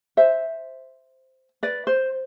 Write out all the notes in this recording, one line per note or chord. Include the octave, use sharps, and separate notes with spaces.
C5 E5
B4 D5
C5